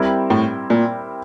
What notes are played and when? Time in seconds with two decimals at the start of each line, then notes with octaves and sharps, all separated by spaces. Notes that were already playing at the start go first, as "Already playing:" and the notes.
Already playing: G3 C4 E4 G4 A#4
0.30 A2
0.70 A#2